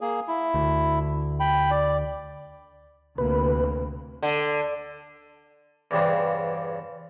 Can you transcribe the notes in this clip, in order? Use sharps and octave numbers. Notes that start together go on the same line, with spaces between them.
A#3 G#4
E4
D2
G5 B5
D5
D2 C3 A#3 B4
D3
E2 G2 C#3 C4 D4